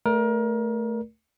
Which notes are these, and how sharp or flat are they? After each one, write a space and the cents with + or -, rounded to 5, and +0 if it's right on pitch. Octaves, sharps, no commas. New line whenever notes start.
A3 +0 A#4 +25 D5 +0